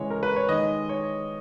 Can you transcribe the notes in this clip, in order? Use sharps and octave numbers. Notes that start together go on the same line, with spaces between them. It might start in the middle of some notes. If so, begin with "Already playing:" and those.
Already playing: C#3 E3 G#3 C#5
A#4
B4
C#5
D#3 G#3 D#5
C#5